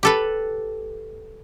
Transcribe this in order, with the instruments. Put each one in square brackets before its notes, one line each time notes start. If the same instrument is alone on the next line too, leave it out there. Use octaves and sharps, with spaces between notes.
[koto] G4 A4 B4